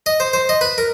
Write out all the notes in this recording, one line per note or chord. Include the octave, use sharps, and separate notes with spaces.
D#5
C5
C5
D#5
B4
A#4